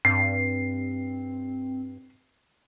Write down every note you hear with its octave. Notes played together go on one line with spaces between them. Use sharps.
G2 C4 C7